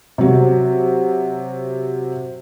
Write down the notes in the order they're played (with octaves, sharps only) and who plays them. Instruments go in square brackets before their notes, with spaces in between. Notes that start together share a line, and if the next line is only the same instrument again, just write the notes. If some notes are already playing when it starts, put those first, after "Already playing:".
[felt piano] C3 F#3